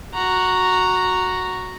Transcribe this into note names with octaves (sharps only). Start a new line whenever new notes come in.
F#4 A#5